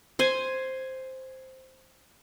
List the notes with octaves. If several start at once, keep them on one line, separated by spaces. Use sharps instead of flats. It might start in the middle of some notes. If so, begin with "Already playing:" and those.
C5 G#5